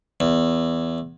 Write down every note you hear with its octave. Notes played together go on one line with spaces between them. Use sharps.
E2